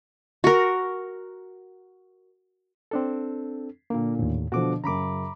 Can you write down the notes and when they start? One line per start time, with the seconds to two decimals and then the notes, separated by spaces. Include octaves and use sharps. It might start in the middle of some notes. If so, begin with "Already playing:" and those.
0.44 F#4 A#4
2.91 C4 D4 A4
3.90 A#2 D3 A#3
4.19 D#2 A2
4.52 B2 D3 F3 F#4 D6
4.84 F#2 C#3 A#5 B5 D6